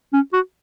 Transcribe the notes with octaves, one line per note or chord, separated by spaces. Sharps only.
C#4
F#4